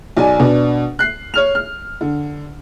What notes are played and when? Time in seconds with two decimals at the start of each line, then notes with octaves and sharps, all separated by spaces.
0.17 B1 D5 G#5
0.39 B2 B3 D4
0.99 F#6 C7
1.34 C#5 F6 F7
1.55 F6
2.01 D3